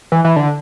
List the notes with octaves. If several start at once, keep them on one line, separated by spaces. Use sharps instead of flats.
E3
E3
D3